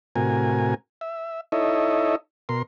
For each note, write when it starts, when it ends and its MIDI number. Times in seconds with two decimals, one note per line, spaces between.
0.16 0.74 45
0.16 0.74 48
0.16 0.74 66
0.16 0.74 70
0.16 0.74 80
1.01 1.41 76
1.52 2.16 63
1.52 2.16 64
1.52 2.16 69
1.52 2.16 73
1.52 2.16 75
1.52 2.16 76
2.49 2.62 47
2.49 2.62 70
2.49 2.62 84